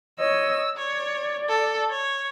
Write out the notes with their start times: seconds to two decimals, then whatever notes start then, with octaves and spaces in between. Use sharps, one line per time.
0.20 C#5 D#5 E6
0.77 C#5 D5
1.49 A4
1.90 C#5